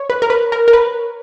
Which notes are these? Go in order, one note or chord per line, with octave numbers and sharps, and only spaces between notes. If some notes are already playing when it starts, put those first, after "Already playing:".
Already playing: C#5
B4
A#4
B4
A#4
A#4
B4